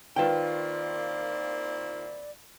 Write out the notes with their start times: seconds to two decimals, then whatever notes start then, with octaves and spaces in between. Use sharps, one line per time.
0.16 D#3 A#3 C4 E4 F4 B4 D5 G5